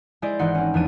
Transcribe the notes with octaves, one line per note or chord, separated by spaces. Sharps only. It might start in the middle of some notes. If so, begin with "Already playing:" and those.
G#3 E4 G#4 C5 D5
G#1 E3 D#4 F#5 C6
C4 C#4
E2 E3 F3 D4 D#7